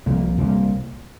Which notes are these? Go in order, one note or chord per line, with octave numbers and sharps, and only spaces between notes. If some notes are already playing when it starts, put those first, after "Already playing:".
C2 C3 F3 A#3
C2 C3 F3 A#3